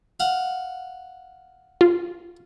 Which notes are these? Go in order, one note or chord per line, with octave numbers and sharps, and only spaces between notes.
F5 F#5
F4